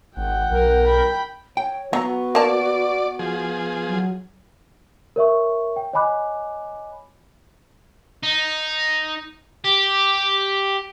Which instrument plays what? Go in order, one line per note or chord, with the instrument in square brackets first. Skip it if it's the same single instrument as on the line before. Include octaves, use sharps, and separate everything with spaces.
[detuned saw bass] G#1 [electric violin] F#5 G5
[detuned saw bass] B1 [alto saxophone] A#4
[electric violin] G5 B5
[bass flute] C#5 [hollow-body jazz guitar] G5
[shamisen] F#3 [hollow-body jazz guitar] B3 A#5 [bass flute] F#4
[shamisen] A#3 A5 [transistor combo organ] D5
[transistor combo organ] F3 G#4
[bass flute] F#3
[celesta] A#4 C#5 E5 C#6
G5
C#5 D#5 G#5 B5 D6 F#6
[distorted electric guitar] D#4
G4